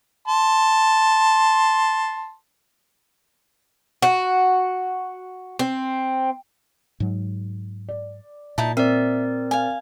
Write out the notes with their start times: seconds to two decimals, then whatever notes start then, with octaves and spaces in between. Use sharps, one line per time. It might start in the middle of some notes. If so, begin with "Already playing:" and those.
0.28 A5 C6
4.02 F#4
5.59 C4
7.00 G#2 F#3
7.89 D5
8.58 A#2 D#4 E4 A5
8.77 C4 A#4 D5 E5
9.51 F5 G#5